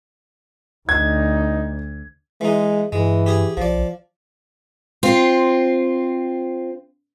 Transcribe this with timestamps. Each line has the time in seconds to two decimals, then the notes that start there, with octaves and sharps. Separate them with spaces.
0.89 D2 D#4 G#6
2.41 E3 G#3 D#4
2.92 G2 E3 G#3
3.26 G4 G#4
3.57 B1 F3 D5
5.03 C4 F4